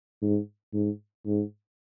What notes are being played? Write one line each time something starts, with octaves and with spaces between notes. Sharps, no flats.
G#2
G#2
G#2